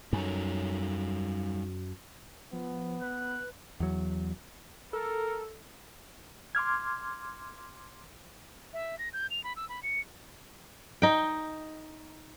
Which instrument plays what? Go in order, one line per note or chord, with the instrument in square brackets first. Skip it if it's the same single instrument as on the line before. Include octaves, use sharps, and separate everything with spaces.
[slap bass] F#2 [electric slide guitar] G3 D#4 A4
[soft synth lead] F3 [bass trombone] B3
[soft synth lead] B4 [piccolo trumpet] F#6
[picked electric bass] E2 F#3
[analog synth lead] A4 [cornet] A#4
[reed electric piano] C6 D6 F6 G#6
[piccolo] E5
A#6
G6
F7
B5
E6
B5
C#7
[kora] D#4 G5